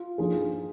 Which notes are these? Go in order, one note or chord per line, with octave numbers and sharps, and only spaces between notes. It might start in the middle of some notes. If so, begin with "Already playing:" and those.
Already playing: F4
G2 F3 A#3 D#4 G#4